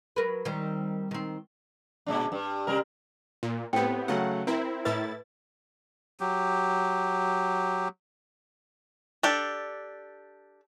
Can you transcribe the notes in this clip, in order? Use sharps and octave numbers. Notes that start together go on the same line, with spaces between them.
F#3 A#4 B4
D#3 G3 C4
D#3 C4
A#2 G#3 D4
G2
C3 G3 A#4
A#2
A2 B3 C4 G4 G5
C#3 F#3 A3 F#5
C4 E4 A#4
A2 E4 B4 A6
F#3 G4
D4 G4 A4